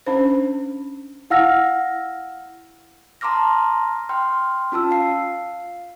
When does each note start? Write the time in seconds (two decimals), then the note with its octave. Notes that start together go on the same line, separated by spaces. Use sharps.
0.06 C#4 D4 C5
1.30 E4 F5 F#5 E6 F6 A#6
3.21 A5 A#5 C6 D6 F6 A#6
4.09 G5 C6 F6
4.72 C#4 F4 A5 E6
4.91 F5 C7